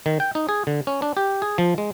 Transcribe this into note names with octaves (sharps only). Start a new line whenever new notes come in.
D#3
G5
D#4
G#4
D3
C#4
D4
G4
G#4
F3
G#3